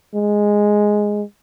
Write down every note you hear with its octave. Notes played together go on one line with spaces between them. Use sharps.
G#3